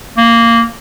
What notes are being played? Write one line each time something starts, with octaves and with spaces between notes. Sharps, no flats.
A#3